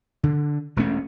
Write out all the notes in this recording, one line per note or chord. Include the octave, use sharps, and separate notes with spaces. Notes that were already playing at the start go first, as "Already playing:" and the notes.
D3
E1 G2 A3 C#4